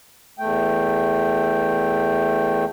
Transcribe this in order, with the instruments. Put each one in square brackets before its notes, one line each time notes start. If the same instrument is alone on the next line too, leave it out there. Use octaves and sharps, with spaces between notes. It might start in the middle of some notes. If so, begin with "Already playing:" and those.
[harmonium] E2 A3 G5